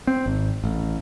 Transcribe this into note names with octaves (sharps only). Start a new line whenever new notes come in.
C4
G#1
A1